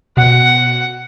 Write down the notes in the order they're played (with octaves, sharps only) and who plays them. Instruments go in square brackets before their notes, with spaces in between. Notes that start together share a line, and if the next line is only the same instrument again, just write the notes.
[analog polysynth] B2 [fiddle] F#5